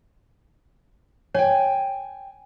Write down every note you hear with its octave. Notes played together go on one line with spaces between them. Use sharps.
C#5 G5 G#5